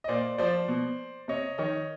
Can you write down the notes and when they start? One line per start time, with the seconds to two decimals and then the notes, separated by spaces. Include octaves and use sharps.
0.04 D#5
0.08 A#2 C5 D5
0.38 F3 C5 D5
0.68 B2
1.28 C3 C#5 D#5
1.58 D#3 C#5 D#5